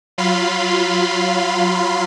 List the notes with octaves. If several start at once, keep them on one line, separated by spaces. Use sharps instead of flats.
F#3 F4 F5 B5 C6